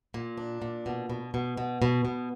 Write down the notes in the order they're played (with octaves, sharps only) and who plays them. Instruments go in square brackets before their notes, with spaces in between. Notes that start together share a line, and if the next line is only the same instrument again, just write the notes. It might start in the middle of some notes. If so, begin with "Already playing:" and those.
[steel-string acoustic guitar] A#2
D4
A#2
B2
B2
B2
B2
B2
B2